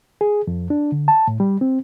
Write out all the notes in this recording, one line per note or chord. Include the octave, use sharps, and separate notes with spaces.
G#4
F2
D4
D3
A5
A2
G3
C4